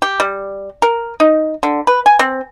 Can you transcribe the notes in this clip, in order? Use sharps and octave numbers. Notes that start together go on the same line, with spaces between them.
G4
G3
A#4
D#4
D3
B4
G#5
C4